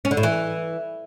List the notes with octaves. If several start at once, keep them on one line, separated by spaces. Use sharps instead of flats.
C#4
D3
A2
E3